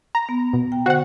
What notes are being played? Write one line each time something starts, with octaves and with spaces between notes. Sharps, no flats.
A#5
B3
B2
G5
D3 F#4 C5 F#5